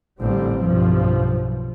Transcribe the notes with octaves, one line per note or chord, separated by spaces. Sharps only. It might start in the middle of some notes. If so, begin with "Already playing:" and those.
A1 D3 G3 C4
B1 G2 F3